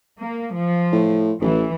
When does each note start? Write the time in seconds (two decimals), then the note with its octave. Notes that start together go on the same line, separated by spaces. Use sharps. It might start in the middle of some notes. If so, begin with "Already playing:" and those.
0.19 A#3
0.53 F3
0.92 A2
1.41 A1 E3